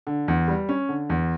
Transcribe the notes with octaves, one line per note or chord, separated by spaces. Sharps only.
D3
E2
G3
C#4
D3
E2